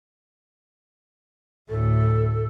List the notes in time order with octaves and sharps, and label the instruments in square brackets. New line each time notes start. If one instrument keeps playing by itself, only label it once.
[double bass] D2 A2 [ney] A4